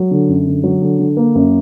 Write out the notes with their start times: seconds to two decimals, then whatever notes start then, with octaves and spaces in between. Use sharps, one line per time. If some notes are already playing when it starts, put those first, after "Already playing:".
Already playing: F#3
0.11 D3
0.29 F#2
0.47 D3
0.64 F#3
0.82 D3
0.99 D3
1.17 A#3
1.35 F#2